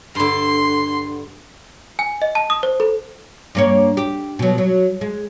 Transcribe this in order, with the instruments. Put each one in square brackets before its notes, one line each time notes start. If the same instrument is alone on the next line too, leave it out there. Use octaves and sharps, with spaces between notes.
[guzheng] G2 D3 [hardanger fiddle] C6
[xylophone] G#5
D#5
A5
D#6
C5
A4
[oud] G2 A#3 C#5
G4
B2 F#3
F#3
G#3